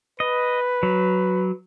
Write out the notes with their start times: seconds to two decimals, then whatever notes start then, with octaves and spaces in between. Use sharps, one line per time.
0.20 B4 D#5
0.83 F#3